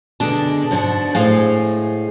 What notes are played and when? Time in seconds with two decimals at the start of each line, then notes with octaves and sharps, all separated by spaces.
0.20 B2 D3 G#3 D4 A5
0.71 G#2 B2 D4 F#4
1.15 A2 G#3 G#4 C5 F5 G#5